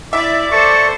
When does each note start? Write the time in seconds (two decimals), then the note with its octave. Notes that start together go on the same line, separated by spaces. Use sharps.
0.13 E4 D5 E5 D6
0.51 A4 C5 D5 C#6